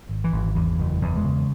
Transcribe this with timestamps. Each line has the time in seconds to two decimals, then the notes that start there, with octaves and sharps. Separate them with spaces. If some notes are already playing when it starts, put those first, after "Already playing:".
0.09 G#1
0.24 E3
0.32 G#1
0.55 E2 E3
0.78 F#1
0.86 E3
1.02 E2
1.17 G#3
1.24 C#3